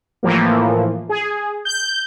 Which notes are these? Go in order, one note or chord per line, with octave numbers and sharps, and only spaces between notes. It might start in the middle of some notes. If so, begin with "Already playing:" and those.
A2 E3 F3 A#3
G#4
G6